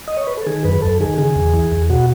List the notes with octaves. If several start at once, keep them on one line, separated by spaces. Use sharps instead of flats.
D#5
C#5
B4
A4
D#3 G#4
F#2 B4
F#2 A4
D#3 G#4
C#3 G#4
E2
E3
E2
B2 F#4